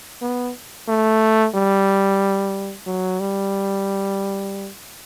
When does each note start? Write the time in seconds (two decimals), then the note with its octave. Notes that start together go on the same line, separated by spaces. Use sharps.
0.22 B3
0.88 A3
1.55 G3
2.87 F#3
3.20 G3